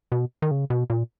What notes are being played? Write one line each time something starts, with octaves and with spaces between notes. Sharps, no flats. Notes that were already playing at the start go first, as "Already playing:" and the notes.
B2
D#3
C#3
B2
A#2